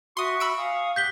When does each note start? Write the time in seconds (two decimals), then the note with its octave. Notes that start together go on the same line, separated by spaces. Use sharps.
0.17 F#4 E5 C6 C#6 D#6
0.40 B5 E6 D7
0.56 F5 G#5 D#6
0.96 G4 F#5 F#6 G6 B6 G7